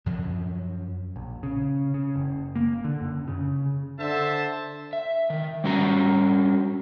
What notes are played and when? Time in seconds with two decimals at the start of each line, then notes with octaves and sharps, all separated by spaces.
0.06 F#2 F3 F#3
1.16 A#1
1.43 C#3
1.94 C#3
2.16 F#1
2.56 A#3
2.84 D3
3.01 F#2
3.28 C#3
3.99 D3 C5 E5 A5
4.93 E5
5.30 D#3
5.64 G3 C#4 F#4 F5 A#5